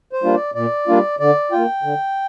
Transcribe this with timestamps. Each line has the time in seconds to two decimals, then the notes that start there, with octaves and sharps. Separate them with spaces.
0.13 C5
0.23 G3 A#3 D4 F4
0.34 D5
0.55 A#2 D5
0.88 G3 A#3 D4 F4
1.20 D3 D5
1.52 A#3 F4 G5
1.83 D3